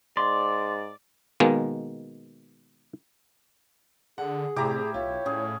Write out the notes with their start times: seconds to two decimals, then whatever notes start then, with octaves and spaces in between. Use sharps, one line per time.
0.17 G#2 D5 C6
1.40 B2 D#3 G#3 A#3
4.18 D3 G#4 F#5
4.56 A2 C3 E4 G4 A#5 D6
4.94 B1 F4 C#5
5.26 A2 C#4 G#4